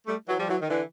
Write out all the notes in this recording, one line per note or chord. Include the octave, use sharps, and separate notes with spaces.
G3 A3
E3 F#3
F3 G3
E3 F#3
D#3
D3 E3